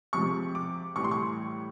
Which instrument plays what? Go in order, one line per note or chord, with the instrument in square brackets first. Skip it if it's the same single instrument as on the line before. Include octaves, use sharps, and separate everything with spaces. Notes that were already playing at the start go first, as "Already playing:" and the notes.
[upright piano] C3 F3 G#3 C#6
D6
A2 E3 G3 C#6
C6
C#6